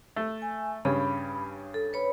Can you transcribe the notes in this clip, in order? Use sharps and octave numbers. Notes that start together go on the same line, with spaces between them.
A3
G#5
G2 C#3 C#4 B5
A4
B4 C#5 B5